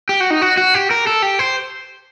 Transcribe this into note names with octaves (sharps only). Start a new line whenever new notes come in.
G4
F#4
D#4
F#4
F#4
G4
A#4
A4
G4
C5